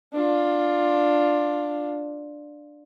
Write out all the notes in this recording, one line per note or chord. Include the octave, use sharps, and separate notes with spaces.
D4 F4